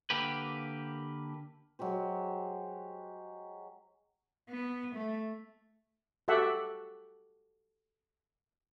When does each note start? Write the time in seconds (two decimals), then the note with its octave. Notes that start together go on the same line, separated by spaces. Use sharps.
0.10 D3 A#3 G4 B4
1.79 F#3 G#3 G4 C5
4.49 B3
4.95 A3
6.28 F#4 G4 A4 E5 F#5